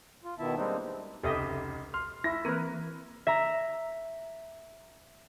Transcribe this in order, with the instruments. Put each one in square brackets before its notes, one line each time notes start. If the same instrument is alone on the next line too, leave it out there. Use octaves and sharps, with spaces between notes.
[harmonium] F4
B2 D#3 B3 E4 E5 A5
G3 G#3 A#3 C4 D4 D#4
[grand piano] F1 C#2 [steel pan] G4 D#5 E5 [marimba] A4 D#6
[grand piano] C6 F6
[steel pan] E4 E5 [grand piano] A#6
[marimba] E3 A#3 C4 [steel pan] A#4 B4
[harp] E5 A#5